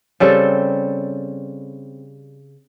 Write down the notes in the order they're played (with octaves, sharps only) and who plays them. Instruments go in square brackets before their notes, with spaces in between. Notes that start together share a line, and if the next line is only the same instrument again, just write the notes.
[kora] C#3 G3 C4 A4